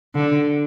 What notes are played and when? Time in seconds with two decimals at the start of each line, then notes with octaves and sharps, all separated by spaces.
0.15 D3